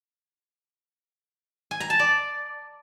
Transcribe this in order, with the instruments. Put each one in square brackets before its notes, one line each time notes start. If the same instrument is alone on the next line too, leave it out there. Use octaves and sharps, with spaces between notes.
[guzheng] G#5
A#5
A5
D5